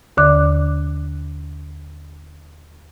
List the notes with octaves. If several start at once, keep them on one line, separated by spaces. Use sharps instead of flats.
D#2 D3 D5 D6 F#6